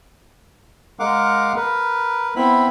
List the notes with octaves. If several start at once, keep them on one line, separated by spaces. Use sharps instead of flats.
G#3 A#4 F5 F#5 D6
A#4 B4
B3 C4 E4 B5